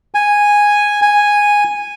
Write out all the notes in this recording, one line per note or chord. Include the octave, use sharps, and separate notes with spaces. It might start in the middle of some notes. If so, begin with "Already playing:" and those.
G#5
G#5